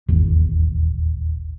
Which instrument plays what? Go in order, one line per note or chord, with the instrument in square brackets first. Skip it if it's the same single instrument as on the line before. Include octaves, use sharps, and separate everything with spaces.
[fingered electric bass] D#1 G#1 E2